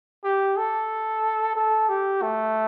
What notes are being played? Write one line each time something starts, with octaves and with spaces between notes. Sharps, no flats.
G4
A4
A4
G4
A3